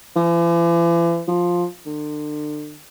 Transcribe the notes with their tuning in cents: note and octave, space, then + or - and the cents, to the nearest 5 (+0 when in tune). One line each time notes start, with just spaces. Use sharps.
E3 +45
F3 +5
D3 +35